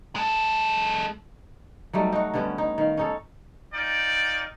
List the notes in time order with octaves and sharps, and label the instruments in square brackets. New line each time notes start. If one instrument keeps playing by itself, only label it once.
[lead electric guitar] G#3 A4
[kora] F#3 G3 A3 D#4
D#4 F#4
D3 G3 B3 C#4
D#4
D#3 F5
C#4 D#4 A4
[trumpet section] D#4 F4 D5 G5